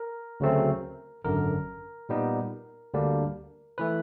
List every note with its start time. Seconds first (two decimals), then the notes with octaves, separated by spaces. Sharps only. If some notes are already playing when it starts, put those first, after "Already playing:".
Already playing: A#4
0.40 D2 C#3 F#3 A3 C4
1.24 G#1 F#2 D3 A#4
2.09 A#2 G3 B3 D#4
2.94 D2 D3 G3 A#3 D4
3.78 E3 A3 B4